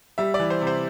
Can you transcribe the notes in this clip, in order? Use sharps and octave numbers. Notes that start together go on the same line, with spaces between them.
G3 E5
D5
E3
C5
C3
C5